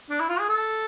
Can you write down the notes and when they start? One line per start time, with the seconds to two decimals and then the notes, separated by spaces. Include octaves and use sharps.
0.10 D4
0.20 E4
0.29 F4
0.39 G#4
0.49 A4